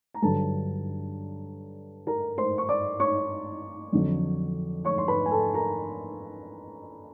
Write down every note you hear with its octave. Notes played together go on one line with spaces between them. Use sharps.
A#5
G2 D3 F#3 A4 A5
A#4 A#5
C5 C6
C#6
D5 D6
C#5 C#6
F2 D3 F#3
C#5 C#6
C6
B4 B5
G#5
A4 A5
A#4 A#5